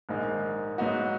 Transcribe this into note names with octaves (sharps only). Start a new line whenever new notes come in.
A#1 G#2 D#3 A#3 D#4
G#2 F#3 B3 D#4 F#4